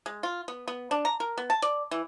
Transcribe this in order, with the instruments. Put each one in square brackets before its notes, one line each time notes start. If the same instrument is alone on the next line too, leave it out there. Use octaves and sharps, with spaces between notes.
[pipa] G#3
F4
B3
B3
D4
A#5
A#4
B3
A5
D5
E3